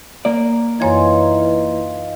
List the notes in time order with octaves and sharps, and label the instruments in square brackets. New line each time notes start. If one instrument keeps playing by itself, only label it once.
[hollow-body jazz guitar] A#3 D5
[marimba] F#2 C#5 G#6 [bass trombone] E3 [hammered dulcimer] D#4 F4 G#5